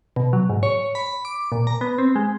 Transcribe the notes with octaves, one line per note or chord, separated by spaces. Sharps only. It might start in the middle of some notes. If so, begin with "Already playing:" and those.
B2
F#3
G#2
C#5
B5
D6
A#2
A#5
B3
C4
G#3